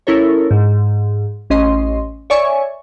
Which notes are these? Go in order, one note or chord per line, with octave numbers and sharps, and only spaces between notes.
C#4 E4 A4 A#4 C#5
G#2
A1 C#4 D#5 C6
C#5 D5 E5 G#5 C#6